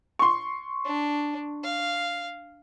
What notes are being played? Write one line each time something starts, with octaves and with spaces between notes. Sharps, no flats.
C6 C#6
D4
F5